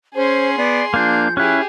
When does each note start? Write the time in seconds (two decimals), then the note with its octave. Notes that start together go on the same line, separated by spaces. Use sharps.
0.15 C#4 G#4 C5 C6
0.58 B3 D5
0.94 F3 A#3 D4 G6
1.37 C#4 E4 G4 G#4 F#6